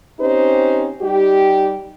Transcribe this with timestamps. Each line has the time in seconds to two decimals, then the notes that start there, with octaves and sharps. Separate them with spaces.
0.20 C4 C#4 D#4 G4 C5
1.02 G3 D#4 G4